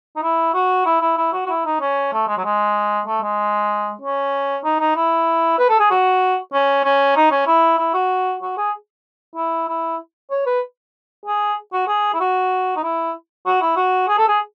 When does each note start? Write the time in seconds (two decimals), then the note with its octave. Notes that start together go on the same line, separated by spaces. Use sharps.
0.16 D#4
0.23 E4
0.54 F#4
0.86 E4
1.01 E4
1.17 E4
1.33 F#4
1.46 F#4
1.49 E4
1.65 D#4
1.81 C#4
2.13 A3
2.27 G#3
2.37 F#3
2.44 G#3
3.06 A3
3.22 G#3
4.01 C#4
4.64 D#4
4.79 D#4
4.96 E4
5.58 B4
5.69 A4
5.79 G#4
5.90 F#4
6.53 C#4
6.84 C#4
7.16 D#4
7.31 C#4
7.47 E4
7.78 E4
7.94 F#4
8.42 F#4
8.57 G#4
9.36 E4
9.68 E4
10.31 C#5
10.46 B4
11.25 G#4
11.73 F#4
11.87 G#4
12.14 E4
12.20 F#4
12.76 D#4
12.83 E4
13.46 F#4
13.61 E4
13.76 F#4
14.08 G#4
14.18 A4
14.28 G#4